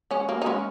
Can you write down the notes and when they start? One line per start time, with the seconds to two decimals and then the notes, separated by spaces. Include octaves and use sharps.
0.11 G#3 C#4
0.29 A#3
0.42 D#4
0.46 G#3 C#4